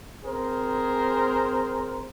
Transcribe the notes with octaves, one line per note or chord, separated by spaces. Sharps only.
C4 G#4 A#4 C5